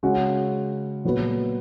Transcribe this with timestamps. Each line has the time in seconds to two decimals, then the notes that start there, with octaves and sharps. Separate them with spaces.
0.03 C#3 G#3 C#4 F#4
1.04 A#2 F#3 B3 F#4 B4